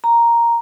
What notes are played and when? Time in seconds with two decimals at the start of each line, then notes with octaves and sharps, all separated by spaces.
0.04 A#5